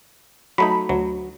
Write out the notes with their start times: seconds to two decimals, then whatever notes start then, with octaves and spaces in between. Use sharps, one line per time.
0.58 F#3 A3 D#4 B5
0.89 D2 F#3